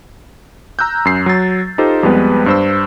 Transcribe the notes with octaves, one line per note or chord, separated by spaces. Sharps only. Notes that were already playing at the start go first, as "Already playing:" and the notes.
A#5 E6 F#6 G6
F#2 C7
F#3 A6
D#4 F4 G4 A4 C5
F2 G3 G#3 B3 B4
G2 C5 E6